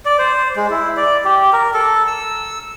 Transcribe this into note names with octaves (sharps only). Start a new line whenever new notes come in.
D5
C5
G#3
E4
D5
G4
A#4
A4
E6